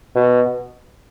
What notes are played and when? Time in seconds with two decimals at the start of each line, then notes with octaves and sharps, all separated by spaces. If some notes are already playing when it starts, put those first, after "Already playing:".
0.15 B2